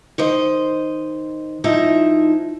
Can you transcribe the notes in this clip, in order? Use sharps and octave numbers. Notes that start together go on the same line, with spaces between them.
D#3 C5 D#5
F3 D#4 E4 E5